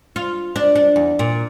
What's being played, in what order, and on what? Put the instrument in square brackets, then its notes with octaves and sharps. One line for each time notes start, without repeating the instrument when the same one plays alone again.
[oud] F4
D4
D4
E2
A#2